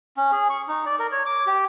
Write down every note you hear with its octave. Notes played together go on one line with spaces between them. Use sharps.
C#4
G#4
C#6
D#4
D5
A#4
C#5
D6
G4